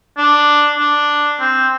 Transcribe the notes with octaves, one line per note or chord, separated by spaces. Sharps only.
D4
D4
C4